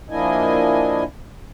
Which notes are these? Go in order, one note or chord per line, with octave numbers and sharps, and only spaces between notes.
F3 A#3 D4 E4 D#5 G#5